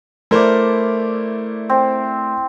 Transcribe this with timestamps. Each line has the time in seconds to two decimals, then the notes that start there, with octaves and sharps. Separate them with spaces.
0.31 A3 E4 A#4 C5 D5
1.70 C4